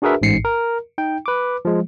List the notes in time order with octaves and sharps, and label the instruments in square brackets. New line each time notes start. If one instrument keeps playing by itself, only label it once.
[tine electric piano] D4 F#4 G#4 A#4 B4 E5
A1 G#2 C7 C#7
A#4
D#4 G5
B4 D6
F3 G#3